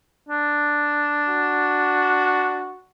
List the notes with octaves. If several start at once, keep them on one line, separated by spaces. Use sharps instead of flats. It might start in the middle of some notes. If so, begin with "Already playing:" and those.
D4
F#4